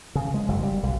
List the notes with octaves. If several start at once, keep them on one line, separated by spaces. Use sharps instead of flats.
C#3
G#3
F#1
G3
B1